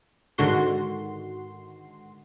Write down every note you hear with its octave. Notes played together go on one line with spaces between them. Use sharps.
G#2 D3 D#3 F#4 C6